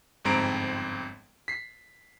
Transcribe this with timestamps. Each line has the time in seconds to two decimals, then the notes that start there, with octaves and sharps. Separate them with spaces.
0.25 G1 F2 G#2 C4 A#5 D7
1.48 B6 C7